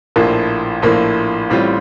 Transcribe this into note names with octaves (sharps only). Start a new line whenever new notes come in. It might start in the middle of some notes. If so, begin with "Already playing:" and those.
A#1 A2 F3 A#3
A#1 A2 F3 A#3
A1 A2 G3 C4 F4